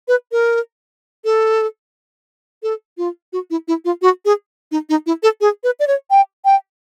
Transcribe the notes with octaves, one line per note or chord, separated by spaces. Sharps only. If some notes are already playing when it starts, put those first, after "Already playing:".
B4
A#4
A4
A4
F4
F#4
E4
E4
F4
F#4
G#4
D#4
D#4
E4
A4
G#4
B4
D5
C#5
G5
G5